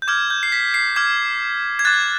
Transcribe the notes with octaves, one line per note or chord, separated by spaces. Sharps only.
G6
D6 F6 G#6
G6
C7
B6
C7
D6 F6 G#6
G#6
D6 F#6 A6